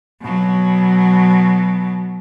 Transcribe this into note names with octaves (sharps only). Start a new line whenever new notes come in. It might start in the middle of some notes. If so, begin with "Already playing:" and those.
B2 F#3